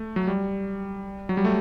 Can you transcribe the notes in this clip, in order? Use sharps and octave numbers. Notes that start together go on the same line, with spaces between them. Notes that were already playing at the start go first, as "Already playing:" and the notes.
Already playing: A3
F#3
G3
F#3
G3
A3